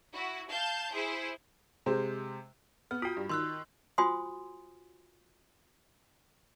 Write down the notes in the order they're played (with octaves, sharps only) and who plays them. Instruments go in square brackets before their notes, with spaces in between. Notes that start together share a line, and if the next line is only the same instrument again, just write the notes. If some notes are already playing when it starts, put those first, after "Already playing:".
[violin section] E4 F#4
F5 A5 G6
E4 G#4 C5
[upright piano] C3 G#3 C5
[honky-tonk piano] B3 [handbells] F6
[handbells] F4 F#4 [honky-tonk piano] G5 D#6
[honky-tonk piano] G2
[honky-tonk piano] D#3 [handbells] C6 E6 F#6
[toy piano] F4 F#4 C5 G#5 C6 D#6